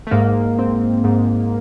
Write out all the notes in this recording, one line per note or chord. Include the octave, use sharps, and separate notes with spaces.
A3
G#2 A#3
C4
G#2